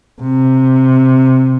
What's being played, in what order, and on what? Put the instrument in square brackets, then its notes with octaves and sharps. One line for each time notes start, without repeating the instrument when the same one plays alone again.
[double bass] C3